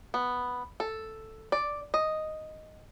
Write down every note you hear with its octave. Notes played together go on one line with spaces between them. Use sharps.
B3
A4
D5
D#5